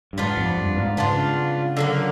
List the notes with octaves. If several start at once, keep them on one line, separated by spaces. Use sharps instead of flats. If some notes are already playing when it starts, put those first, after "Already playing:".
G2
G#2 B3 D4 F4
F2
G2
G#2
C#3 B3 D4 F4
D3 F#3 A#3